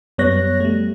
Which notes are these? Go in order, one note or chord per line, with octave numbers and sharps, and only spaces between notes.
F#2 G3 B3 C#5 F#6 A#6
G3 A3